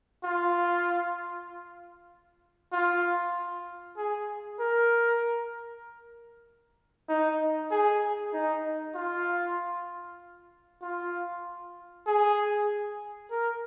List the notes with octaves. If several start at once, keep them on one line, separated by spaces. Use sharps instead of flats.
F4
F4
G#4
A#4
D#4
G#4
D#4
F4
F4
G#4
A#4